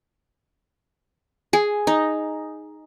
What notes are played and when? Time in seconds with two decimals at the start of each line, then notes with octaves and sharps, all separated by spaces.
1.53 G#4
1.87 D#4